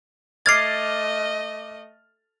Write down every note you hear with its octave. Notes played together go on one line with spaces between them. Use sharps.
A3 D#5 D6 F6 G#6 A6 C7